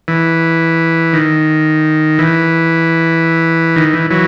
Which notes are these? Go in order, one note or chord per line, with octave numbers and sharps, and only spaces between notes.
E3
D#3
E3
D#3
E3
E3 F#3